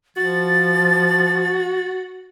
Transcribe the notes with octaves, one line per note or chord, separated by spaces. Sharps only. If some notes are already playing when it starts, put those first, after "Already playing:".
F3 F#4 A6